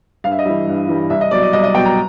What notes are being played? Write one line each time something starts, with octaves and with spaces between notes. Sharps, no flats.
G2 F5
E5
D#5
E3 G3 E5
G2
E3 G3
C2 E5
D#5
B2 F#3 D5
D#5
C2 D#5
D#5
B2 F#3 G5
A#5